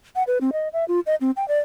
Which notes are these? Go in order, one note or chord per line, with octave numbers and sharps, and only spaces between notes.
F#5
B4
C4
D#5
E5
F4
D#5
C4
G5
D5